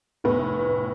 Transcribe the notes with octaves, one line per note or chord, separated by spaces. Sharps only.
F1 A2 B3